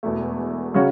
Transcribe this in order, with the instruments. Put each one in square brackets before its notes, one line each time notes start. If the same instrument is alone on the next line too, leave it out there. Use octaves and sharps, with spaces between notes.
[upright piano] E1 E2 B2 A3
C#3 F#3 C#4 F#4 C#5